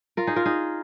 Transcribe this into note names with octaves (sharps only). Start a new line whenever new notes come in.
F4 A#4
D#4 G#4
F4 A#4
D#4 G#4